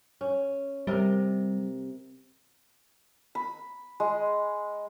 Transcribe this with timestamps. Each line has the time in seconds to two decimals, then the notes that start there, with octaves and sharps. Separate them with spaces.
0.21 C#4
0.87 C3 G3 A#4
3.35 B5
4.00 G#3